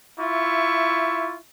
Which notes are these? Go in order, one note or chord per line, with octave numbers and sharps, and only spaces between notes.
E4 F4 E5 C#6